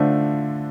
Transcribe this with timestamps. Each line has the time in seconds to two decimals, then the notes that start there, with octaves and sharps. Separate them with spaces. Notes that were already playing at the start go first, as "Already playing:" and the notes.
Already playing: D3 A3 D4 F4 C5